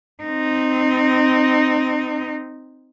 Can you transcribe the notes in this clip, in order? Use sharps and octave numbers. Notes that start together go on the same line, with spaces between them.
C4 D#4